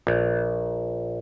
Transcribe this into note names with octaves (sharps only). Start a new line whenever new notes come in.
A#1